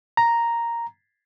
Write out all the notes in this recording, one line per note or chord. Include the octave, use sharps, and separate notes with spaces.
A#5